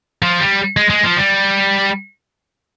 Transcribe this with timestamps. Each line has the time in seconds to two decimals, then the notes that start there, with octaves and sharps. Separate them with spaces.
0.22 F3
0.40 G3
0.77 G#3
0.90 G#3
1.04 F3
1.17 G3